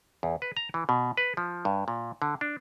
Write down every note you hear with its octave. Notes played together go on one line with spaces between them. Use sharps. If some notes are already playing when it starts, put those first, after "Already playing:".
E2
B4
A#5
E3
B2
B4
F3
G2
A#2
D3
D4